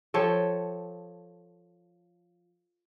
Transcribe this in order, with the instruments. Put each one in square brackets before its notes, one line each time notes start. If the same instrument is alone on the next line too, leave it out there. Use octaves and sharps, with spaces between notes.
[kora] F3 A4 C#5 G5